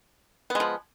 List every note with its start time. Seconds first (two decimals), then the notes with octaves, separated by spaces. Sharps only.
0.50 B3
0.55 G#3
0.60 F3